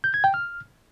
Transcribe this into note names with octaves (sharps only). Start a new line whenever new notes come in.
G6
G#6
G5
F6